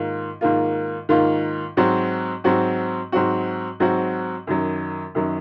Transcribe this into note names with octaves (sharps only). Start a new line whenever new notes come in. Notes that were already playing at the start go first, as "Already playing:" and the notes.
Already playing: G#2 D#3 A#3 F4
G#2 D#3 A#3 F4
G#2 D#3 A#3 F4
G#2 F#3 C4 F#4
G#2 F#3 C4 F#4
G#2 F#3 C4 F#4
G#2 F#3 C4 F#4
F#2 D#3 F#3
F#2 D#3 F#3